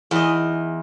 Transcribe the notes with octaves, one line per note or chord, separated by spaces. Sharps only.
E2 D#5